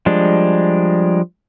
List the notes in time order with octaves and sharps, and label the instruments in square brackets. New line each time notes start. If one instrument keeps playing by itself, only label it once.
[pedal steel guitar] F3 G3 G#3 D4